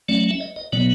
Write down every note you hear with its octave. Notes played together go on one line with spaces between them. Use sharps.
F#3 A3 C#4 D5
E5
D#5
D#5
B2 F#3 B3 D5